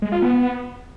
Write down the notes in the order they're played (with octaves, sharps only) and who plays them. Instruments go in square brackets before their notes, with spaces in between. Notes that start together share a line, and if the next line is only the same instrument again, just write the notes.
[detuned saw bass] G#3
F4
B3